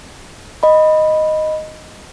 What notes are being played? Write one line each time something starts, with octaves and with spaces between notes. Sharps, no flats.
D#5 B5